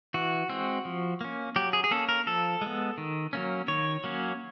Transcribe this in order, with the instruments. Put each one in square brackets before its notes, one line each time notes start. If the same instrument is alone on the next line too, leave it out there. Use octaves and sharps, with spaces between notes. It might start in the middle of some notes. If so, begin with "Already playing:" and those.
[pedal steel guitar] E3 F#4
G#3 C4
F3
A#3 C#4
F#3 G4
G#4
G#4
A#3 C#4 A4
A#4
F3 A4
G#3 B3
D#3
F#3 A#3 C#4
D#3 C#5
F#3 A#3 C#4